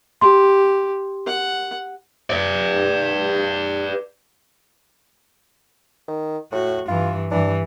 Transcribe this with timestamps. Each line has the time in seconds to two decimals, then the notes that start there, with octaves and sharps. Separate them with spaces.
0.21 G4 C6
1.26 F#5
2.30 B4 D5
6.08 D#3
6.52 A2 F#4
6.88 G2 E3 F4
7.31 G2 E3 D4